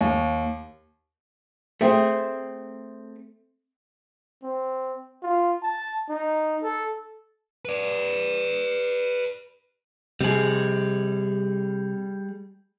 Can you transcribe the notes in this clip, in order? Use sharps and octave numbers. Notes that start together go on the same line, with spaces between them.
D#2
A3 C4 G#4
C4
F4
A5
D#4
A4
B4 D5
C3 G3 G#4